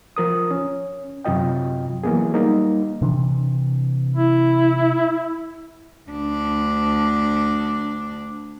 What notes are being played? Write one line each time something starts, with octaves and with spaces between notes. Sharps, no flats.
F3 A#4 D#6
C#4
F#2 C3 F#3 F4 D#5 G5
E3 F#3 A#3 B3 G#4
G3 A#3 D#4
C3 E3 D4
E4
D2 D4